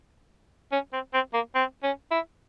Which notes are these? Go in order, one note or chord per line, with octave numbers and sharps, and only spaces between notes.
C#4
C4
C4
A#3
C4
C#4
E4